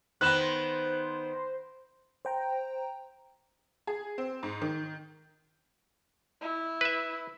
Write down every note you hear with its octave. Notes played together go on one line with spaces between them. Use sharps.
D#3 B3 C5 F#6 E7
C5 G5 A#5
G#4
C4
G#2
D#3
E4
B4 E5